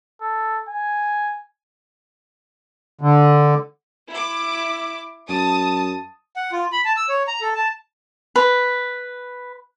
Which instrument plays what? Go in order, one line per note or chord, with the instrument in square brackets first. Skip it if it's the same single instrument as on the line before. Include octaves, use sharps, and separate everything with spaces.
[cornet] A4
G#5
[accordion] D3
[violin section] E4 D6
[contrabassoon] F#2 [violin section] A5 D#6
[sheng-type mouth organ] F#5
F4
B5
A5
E6
C#5
A#5
A4
A5
[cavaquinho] B4